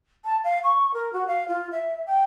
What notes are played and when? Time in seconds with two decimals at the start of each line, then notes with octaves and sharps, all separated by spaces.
0.25 A5
0.44 F5
0.64 C#6
0.94 A#4
1.13 F#4
1.28 F5
1.48 F4
1.72 E5
2.07 G5